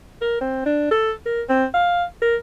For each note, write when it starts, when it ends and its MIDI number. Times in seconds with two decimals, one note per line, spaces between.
0.21 0.40 70
0.41 0.62 60
0.66 0.89 62
0.91 1.12 69
1.26 1.42 70
1.49 1.65 60
1.74 2.04 77
2.22 2.36 70